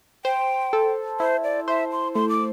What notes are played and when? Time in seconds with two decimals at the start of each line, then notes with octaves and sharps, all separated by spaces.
0.25 C5 G5
0.73 A4
1.20 E4 C5
1.44 D5
1.68 C5 E5
1.92 C6
2.15 A3 C6
2.29 D6